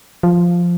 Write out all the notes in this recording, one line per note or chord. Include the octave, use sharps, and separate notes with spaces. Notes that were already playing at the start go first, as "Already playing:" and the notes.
F3